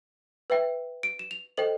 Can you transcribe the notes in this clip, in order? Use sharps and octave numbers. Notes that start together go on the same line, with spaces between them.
B4 E5 G5
D7
E7
F7
A4 C5 D#5 G5 F#7